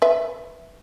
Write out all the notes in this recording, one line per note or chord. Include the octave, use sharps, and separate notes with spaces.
B4 E5